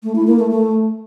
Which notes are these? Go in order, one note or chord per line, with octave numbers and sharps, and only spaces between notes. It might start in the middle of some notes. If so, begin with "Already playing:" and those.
A3
E4
A#3
A3
A3